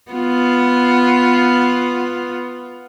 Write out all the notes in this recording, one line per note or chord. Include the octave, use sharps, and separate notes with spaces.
B3 F4